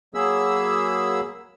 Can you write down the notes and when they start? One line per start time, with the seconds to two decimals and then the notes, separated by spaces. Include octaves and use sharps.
0.14 F#3 A#3 G#4 B5 E6